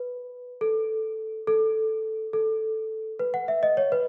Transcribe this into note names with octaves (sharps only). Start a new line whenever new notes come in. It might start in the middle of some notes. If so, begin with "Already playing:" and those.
Already playing: B4
A4
A4
A4
B4
F#5
E5
D#5
C#5
B4